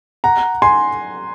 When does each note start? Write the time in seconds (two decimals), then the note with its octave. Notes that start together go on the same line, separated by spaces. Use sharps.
0.24 F#5 A#5
0.62 G#5 C6